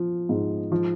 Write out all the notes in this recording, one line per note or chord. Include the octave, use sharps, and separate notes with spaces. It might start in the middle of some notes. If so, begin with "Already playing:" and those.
Already playing: F3
G#2
F3